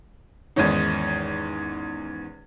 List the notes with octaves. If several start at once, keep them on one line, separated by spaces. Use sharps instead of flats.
E2 G#2 D#3 C#4 D#4